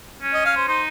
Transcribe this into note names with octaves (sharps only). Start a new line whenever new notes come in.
C#4
D#5
F5
C5
D#4 C5